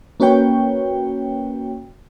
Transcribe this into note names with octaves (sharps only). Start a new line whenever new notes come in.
A#3 C#4 F#4 B4 C#5 G5